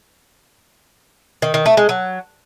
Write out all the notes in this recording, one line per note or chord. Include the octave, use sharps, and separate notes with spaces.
D#3
D#3
A3
G#3
F#3